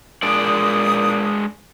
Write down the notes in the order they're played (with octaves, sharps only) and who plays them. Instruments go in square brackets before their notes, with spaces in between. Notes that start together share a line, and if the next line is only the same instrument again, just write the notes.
[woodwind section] A#2 D#6 [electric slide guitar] G#3 D4 D5